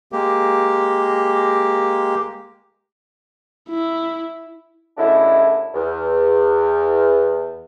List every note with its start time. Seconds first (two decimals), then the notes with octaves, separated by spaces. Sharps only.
0.12 G#3 A#3 G4
3.69 E4
4.98 F#2 A2 D3 G#3 D4 E4
5.74 E2